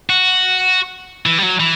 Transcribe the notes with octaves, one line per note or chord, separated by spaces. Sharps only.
F#4
E3
G3
F#3
E3